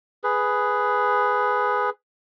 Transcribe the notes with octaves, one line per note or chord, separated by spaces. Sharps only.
G#4 B4